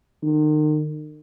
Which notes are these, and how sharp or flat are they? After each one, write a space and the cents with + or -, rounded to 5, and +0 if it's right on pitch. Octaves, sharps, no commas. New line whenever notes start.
D#3 -35